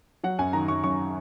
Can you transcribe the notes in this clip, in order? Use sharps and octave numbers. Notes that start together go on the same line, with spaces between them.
F#3 F#5
F#2 G#5
D#3 A#5
F#2 C#6
F#2 C#6